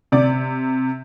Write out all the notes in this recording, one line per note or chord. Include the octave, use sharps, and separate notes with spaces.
C3 D5